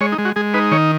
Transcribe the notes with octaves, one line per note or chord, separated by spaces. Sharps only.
G#3 C#5
D#4
G#3
F#4
G#3 G#4
D#4 B4
D#3 C#5